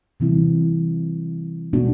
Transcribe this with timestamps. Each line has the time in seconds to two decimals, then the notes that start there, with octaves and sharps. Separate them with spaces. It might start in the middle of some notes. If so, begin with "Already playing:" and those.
0.20 C3 E3 G3 C4 E4
1.73 B2 G#3 B3 D4 F#4